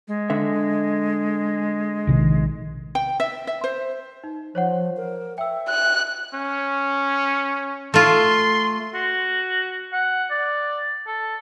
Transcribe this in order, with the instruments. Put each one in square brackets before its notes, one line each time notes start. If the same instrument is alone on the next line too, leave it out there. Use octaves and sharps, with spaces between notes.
[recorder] G#3
[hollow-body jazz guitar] D3 E5
[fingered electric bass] A#1 C3 D#3
[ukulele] G5
E5
E5
C5
[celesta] D#4
[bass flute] F3 [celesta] C5 C#5 F#5
[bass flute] A#4
[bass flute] E5 [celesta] G5 E6
[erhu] F#6
[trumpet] C#4
[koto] A3 F4 [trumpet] C6
[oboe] F#4
F#5
D5
A4